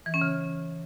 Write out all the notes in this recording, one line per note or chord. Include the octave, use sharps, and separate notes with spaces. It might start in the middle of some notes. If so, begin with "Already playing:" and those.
E3
C#4
C#3